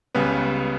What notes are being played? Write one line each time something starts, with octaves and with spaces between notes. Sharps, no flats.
C#2 C#3 G3 B3 B4